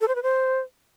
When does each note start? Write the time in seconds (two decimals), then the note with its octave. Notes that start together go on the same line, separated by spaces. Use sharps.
0.01 A4
0.08 C5
0.15 B4
0.23 C5